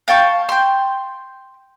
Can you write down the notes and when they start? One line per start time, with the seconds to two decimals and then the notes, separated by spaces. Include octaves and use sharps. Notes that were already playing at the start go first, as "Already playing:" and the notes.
0.08 F5 G5 A5 C#6
0.49 G5 C6